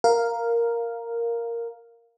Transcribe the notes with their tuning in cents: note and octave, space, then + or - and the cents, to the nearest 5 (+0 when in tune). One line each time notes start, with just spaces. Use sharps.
A#4 +0 F5 +0